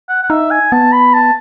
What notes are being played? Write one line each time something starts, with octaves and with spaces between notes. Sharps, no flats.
F#5
F#5
D#4 E5
G#5
B3 A5
B5
A5